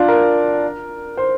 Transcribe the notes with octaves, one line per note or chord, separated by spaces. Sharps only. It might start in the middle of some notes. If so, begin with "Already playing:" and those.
Already playing: D4 F4
A#4
C5